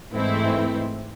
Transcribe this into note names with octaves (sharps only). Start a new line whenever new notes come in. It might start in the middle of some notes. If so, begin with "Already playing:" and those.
G#2 E3 A3 C4 E4